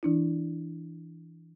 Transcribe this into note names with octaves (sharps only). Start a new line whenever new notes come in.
E3 D4 E4